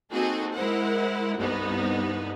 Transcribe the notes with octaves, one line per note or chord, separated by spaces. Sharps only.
A#3 C4 D#4 F#4 G#4 A4
G#3 E4 A#4 C5 F#5
C2 G2 B3 D#4